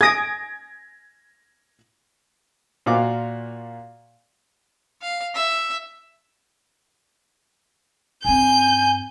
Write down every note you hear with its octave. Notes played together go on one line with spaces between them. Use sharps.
G#4 D#6 G#6 A#6 D7
A#2 F4 F#4 F5 D6
F5
E5
G2 C4 G#5 G6